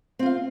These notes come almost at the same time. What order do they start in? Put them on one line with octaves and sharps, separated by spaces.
C4 F4 F5